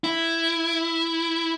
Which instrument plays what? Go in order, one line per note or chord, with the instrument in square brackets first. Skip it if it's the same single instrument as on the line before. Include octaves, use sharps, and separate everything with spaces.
[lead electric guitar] E4